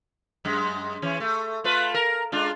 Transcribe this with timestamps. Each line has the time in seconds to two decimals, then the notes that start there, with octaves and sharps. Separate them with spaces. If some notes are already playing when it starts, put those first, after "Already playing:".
0.45 F#2 G#3
1.02 E3 C#4
1.20 A3
1.64 A3 F4 B4
1.94 A#4
2.32 G#3 D4 F4